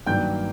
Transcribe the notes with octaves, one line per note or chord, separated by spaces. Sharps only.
G2 D#3 F#3 A#3 D4 G5 G6